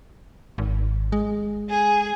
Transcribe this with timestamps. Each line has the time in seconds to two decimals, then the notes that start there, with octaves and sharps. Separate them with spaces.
0.58 G#1
1.12 G#3
1.69 G#4